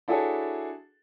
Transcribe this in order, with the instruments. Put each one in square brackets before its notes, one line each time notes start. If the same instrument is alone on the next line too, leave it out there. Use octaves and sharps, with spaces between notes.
[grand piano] D4 E4 F#4 G#4 A4 C#5